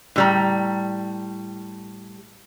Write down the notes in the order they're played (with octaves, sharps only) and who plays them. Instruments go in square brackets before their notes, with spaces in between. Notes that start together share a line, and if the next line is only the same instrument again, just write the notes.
[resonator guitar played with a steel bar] A2 G3 A#5